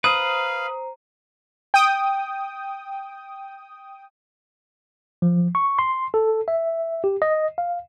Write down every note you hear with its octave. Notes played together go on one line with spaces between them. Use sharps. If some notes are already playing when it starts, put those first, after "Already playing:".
B4 C5 F5 A#5 D#6 D#7
G5 D#6
F3
C#6
C6
A4
E5
G4
D#5
F5